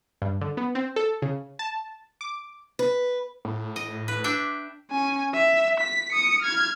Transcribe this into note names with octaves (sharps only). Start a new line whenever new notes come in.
G2
D3
B3
C4
A4
C#3
A5
D6
B4
A2
D#5
B4
D4 E5 G5
C#4 G#5
E5
B6
D#6 C#7
F6 G#6